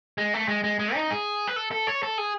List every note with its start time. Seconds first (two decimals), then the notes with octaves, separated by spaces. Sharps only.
0.18 G#3
0.34 A3
0.48 G#3
0.64 G#3
0.79 G#3
0.95 D#4
1.11 G#4
1.47 B4
1.56 A4
1.72 A4
1.87 C#5
2.03 A4
2.18 G#4